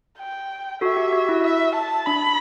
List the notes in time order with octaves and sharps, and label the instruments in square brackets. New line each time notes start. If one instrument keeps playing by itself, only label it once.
[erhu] G5
[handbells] F#4 A4 [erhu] E5
[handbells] G4
F#4
E4
[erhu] E5
A5
[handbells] D4 [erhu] B5